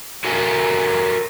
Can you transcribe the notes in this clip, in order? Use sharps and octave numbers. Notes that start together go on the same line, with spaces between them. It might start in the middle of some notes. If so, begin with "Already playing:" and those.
F#4 A4 A#4 E5 F5 G#5